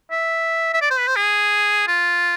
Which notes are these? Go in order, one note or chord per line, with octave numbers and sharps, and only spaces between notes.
E5
E5
D5
C5
B4
C5
G#4
F4